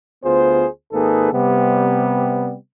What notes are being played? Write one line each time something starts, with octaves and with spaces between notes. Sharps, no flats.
D2 B3 F4 G#4 C5
G#1 A#3 D#4 G#4 A4 B4
C3 G3 B3